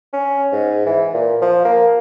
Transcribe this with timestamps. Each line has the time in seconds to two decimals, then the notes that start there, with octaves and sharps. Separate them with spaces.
0.13 C#4
0.52 G#2
0.86 E3
1.13 A#2
1.42 F3
1.65 A#3